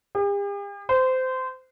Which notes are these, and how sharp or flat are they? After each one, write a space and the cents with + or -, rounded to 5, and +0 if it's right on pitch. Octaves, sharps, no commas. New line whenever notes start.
G4 +45
C5 -20